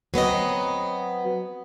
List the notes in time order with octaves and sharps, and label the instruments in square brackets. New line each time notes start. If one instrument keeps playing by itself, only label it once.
[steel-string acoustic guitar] F#3 B3 C4 D#5